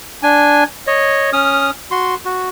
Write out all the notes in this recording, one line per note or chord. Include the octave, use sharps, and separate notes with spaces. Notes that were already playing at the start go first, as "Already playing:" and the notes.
D4 G#5
C#5 D#5
C#4 D#6 F6
F#4 C6
F#4